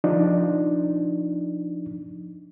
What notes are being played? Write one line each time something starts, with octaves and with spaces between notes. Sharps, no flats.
F3 D4 D#4